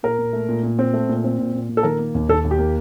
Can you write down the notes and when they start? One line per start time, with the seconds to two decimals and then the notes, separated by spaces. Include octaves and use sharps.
0.03 A#2 A#4
0.19 A#2
0.33 A3
0.49 A#2
0.63 A#2
0.79 C4
0.94 A3
1.09 A#2
1.24 C4
1.39 A#2
1.53 A#2
1.69 A#2
1.77 A4
1.83 D#3 A#4
1.99 A#3
2.15 D#2
2.29 D#2 A4
2.44 D#2
2.51 G4
2.59 A#3